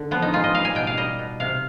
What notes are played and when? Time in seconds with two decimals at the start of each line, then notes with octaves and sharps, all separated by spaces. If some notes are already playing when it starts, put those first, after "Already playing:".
Already playing: D3
0.11 F3 B3
0.22 D#4
0.33 G#3 F4
0.44 D#5
0.54 G3 F5
0.65 G#5
0.75 B2 G5
0.87 F5
0.97 G3 D#5
1.19 B2
1.40 C3 F5